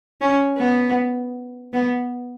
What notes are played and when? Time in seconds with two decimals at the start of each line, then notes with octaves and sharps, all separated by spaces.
0.21 C#4
0.58 B3
1.73 B3